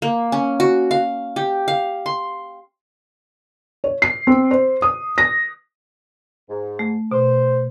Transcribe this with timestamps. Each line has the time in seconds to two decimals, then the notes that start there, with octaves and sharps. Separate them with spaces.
0.02 A#3
0.32 C#4
0.60 F#4
0.91 F5
1.36 G4
1.68 F5
2.06 C6
3.84 C#5
4.02 C7
4.27 C4
4.51 C5
4.82 D#6
5.18 A#6
6.49 G#2
6.79 A3
7.11 B2 C5